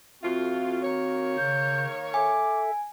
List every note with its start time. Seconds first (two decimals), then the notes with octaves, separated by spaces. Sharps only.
0.23 F2 A3 C4 F4 F#4
0.83 D#3 A#3 C#5
1.37 C#3 G6
2.14 A4 E5 G#5 D6